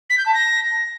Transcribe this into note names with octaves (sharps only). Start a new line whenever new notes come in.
B6
G6
A5
A#6